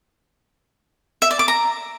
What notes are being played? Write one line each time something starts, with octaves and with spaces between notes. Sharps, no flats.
E5
D5
D6
A#5